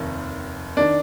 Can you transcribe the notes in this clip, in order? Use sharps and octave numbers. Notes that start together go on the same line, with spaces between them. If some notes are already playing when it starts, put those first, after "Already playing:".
Already playing: F1 D#2 D#3
D#3 D4